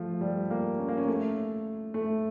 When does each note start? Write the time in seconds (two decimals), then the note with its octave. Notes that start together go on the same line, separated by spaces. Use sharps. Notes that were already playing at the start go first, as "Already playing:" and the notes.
Already playing: F3 A3
0.21 G3
0.50 A#3
0.79 C#4
0.88 A#3
0.98 C#4
1.08 A3
1.94 A3